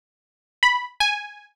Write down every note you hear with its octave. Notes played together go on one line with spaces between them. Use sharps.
B5
G#5